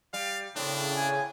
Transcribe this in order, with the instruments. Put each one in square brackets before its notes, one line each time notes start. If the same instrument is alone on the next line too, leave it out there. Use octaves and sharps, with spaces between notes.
[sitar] G3 [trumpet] F5
[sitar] A2 C4 [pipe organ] C#3 [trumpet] D4
[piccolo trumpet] G#5